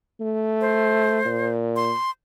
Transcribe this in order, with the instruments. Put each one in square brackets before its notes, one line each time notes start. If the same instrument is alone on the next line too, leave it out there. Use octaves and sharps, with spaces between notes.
[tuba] A3
[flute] C5
[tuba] A#2
[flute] C6